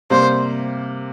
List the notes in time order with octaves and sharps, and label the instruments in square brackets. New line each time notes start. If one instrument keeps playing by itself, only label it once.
[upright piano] C3 G3 A#3 [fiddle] C5